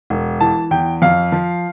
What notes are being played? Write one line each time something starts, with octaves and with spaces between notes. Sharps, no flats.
E1
E3 A5
E2 G5
F2 F5
F3